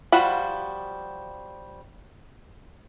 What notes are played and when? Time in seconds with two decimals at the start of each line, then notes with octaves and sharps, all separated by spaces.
0.12 F3 G3 F#4 F#5 B5